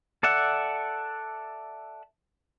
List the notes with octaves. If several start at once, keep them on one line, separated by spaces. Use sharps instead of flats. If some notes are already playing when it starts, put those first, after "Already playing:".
A4 D5 E5 F#5